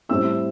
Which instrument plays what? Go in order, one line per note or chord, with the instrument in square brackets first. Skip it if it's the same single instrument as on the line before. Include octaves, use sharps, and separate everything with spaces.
[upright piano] A2 G3 C4 E4 E6